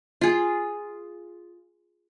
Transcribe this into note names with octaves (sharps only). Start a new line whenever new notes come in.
F4 G#4